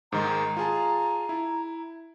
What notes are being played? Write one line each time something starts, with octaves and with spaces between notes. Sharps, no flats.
G#2 D#3 G#3 A#5
F4 G#4 A5
E4